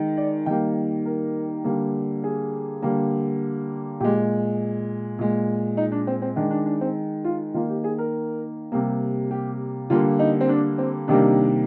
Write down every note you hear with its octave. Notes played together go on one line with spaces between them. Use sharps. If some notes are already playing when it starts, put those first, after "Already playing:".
Already playing: D#3 G#3
D5
D#3 G3 A#3 G5
A#4
D3 G3 A#3
G#4
D3 G3 A#3
A#2 G#3 G4
A#2 G#3
D#4
D4
C4
C4
D#3 G#3 D4
D4
D4
C4
F4
D#3 A#3 F4
G4
G#4
A#4
C3 G3 A#3
G4
D3 G3 A#3 F4
D#4
C4
D4
C4
C3 D#3 G3 A#3 D4